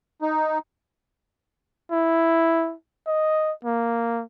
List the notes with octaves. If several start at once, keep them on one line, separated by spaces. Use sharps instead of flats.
D#4
E4
D#5
A#3